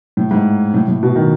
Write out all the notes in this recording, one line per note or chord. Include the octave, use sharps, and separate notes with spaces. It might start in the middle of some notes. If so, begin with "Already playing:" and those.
A2
G#2
A2
A2
B2
D#3